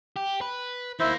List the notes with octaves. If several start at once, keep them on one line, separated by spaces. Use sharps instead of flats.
G4
B4
D#3 A#3 E4 C5 E5